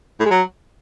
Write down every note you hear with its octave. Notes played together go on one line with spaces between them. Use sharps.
A2
G#3
F#3